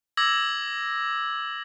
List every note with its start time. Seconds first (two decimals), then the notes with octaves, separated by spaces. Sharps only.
0.17 D6 E6 G#6 A#6 F#7